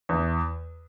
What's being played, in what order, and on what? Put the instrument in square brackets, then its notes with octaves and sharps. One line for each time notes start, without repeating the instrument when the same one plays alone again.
[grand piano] E2